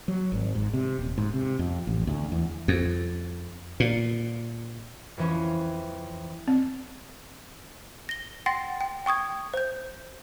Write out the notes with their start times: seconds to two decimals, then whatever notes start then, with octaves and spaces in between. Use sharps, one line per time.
0.08 F#3
0.32 G#1
0.55 G#2
0.73 C3
0.99 D#1
1.18 G#2
1.33 C3
1.59 F2
1.87 A1
2.07 D2
2.32 E2
2.68 F2
3.80 A#2
5.17 F2 E3 C#4
6.48 C4
8.09 A#6 G7
8.46 F#5 G5 C6 A6 A#6 C7
8.81 G5
9.06 G5 C#6 D#6 G#6
9.54 C5 G6